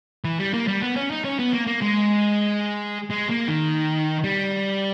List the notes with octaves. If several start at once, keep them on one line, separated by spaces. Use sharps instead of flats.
E3
G3
A#3
G3
B3
C#4
D#4
C#4
B3
A#3
A#3
G#3
G#3
A#3
D#3
G3